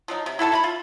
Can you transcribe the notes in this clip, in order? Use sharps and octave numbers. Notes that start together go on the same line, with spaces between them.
F3 F#3 D#4
C3
E4 F#4 A4 A5
E4 A#5 B5
F4